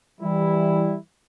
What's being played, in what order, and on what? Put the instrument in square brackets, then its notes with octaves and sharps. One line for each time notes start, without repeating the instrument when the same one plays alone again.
[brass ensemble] E3 G3 E4